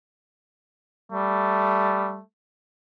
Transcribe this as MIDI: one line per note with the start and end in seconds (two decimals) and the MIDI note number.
1.12 2.19 55
1.12 2.24 57